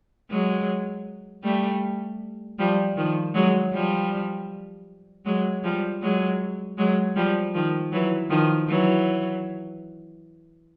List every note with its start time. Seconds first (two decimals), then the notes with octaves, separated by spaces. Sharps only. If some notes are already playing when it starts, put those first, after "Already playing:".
0.30 F#3 G#3
1.44 G3 A3
2.59 F3 G3
2.97 D#3 F3
3.34 F#3 G#3
3.73 F3 G3
5.25 F#3 G#3
5.63 F3 G3
6.02 F#3 G#3
6.78 F#3 G#3
7.16 F3 G3
7.54 D#3 F3
7.92 E3 F#3
8.30 D#3 F3
8.68 E3 F#3